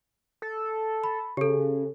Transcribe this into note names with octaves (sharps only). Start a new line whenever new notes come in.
A4
B5
C#3 G4 A4